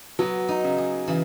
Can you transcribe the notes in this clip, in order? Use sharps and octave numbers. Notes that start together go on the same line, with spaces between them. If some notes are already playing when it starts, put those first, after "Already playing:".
F#3 B3
D#4
C#3
G#4
C#3 E3